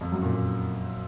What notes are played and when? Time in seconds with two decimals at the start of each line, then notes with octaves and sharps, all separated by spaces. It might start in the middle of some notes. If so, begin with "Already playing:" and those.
0.01 F2
0.12 F#2
0.22 A#2
0.33 A#2